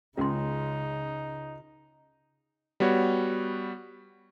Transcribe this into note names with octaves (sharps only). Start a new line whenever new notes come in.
C#2 C#3 G#3 C#4 D#4 C6
G3 B3 F#4 C#5